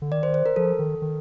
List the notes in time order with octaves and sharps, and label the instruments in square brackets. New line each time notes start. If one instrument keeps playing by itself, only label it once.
[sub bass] D3
[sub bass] D#3 [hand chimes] D5
[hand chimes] C5
C5
A#4
[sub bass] F3 [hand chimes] A4
[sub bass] D#3
D#3